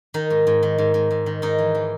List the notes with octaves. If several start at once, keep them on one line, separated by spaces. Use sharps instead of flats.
D#3 D#4
G#2
G#2
D#3
G#2
G#2
G#2
D#3
G#2 D#4
E3
E3